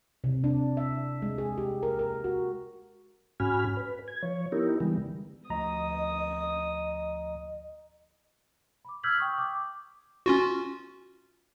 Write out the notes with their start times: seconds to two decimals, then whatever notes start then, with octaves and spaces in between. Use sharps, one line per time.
0.24 C3
0.44 D4
0.77 E5
1.22 G#3
1.38 G#4
1.58 G4
1.83 A#4
1.99 A#4
2.24 F#4
3.40 G#2 C#4 F#4 G#5 B5 F6
3.77 B4
4.08 G#6
4.23 F3 C#5
4.52 B3 D#4 E4 G4 A#4
4.80 D3 E3 G3 G#3 B3
5.50 D2 F3 D#5 A#5 D#6
8.85 B5 D6
9.03 E6 F6 G6 G#6 B6 F#7
9.17 G5 C#6 D#6 G6
9.38 D6
10.26 C#4 F4 F#4